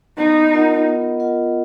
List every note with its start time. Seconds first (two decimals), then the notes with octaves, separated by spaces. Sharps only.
0.17 B3 D#4
0.51 F4 A#4 D#5 F#5
0.86 B3
1.20 F4 A#4 D#5 F#5